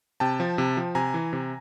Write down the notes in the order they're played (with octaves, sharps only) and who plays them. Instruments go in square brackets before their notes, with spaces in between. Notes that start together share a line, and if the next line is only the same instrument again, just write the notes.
[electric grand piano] C3 G5 A5
F3
C3
F3
C3 G#5 A#5
E3
C3